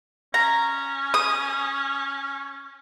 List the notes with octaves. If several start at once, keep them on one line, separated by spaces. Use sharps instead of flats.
C#4 A#5
D#6